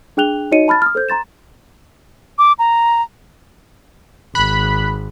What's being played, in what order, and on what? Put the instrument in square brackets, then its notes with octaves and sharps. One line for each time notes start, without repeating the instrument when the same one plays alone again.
[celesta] D4 G#4 G5 F#6 F7 G7
D#4 F#4 C#5 D#5 C#7 D#7
A5 B5 F6 A6
D#6 F6
A4 C5 G6
A#5 C6 A6 E7
[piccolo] D6
A#5
[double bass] G#1 [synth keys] B5 F#6